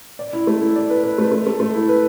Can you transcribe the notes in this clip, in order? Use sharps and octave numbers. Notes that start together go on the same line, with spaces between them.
D5
E4
A3
E4
D5
B4
B4
A3
A3
A3
A3
E4
B4